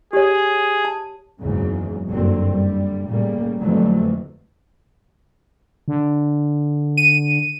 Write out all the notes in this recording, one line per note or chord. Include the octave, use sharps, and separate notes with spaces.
G4 G#4 C#5
A5
F#1 E2 G#2 C#3 F#3
F#1 G2 D3 F#3 C4
D3 G3
A2 C#3 G3 A#3
F2 D3 E3 F#3 G3 A3
D3
D#7